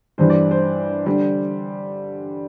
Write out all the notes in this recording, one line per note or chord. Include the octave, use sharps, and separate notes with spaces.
G2 E3 G3 C5
D5
C5
D3 G3